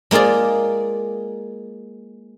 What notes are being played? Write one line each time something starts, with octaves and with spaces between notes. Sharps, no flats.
G#3 A#3 F4 G#4 D5